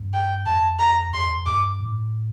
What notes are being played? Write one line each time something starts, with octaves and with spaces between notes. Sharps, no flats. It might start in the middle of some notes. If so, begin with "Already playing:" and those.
Already playing: G2
G5
F2 A5
A#5
F2 C6
F2
G2 D6
A2